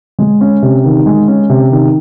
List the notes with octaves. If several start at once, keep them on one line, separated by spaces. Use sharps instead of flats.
G#3
C#4
C3
D#3
G#3
C#4
C3
D#3